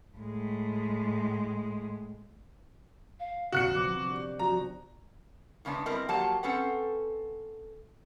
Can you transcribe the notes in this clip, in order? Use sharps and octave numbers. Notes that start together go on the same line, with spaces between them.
A2 G#3
F5
A#1 C3 F#4 F#6 C#7
F3 B3 D6
D4 G4
F3 F#4 A#5
A2 C#3 G#3 B3 D4
G3 C4 E4 A#4 B4 D#5
F3 F#3 A#3 G4 F#5 A5
C4 C#4 A4 B4 F#5